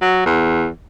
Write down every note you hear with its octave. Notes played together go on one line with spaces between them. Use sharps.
F#3
E2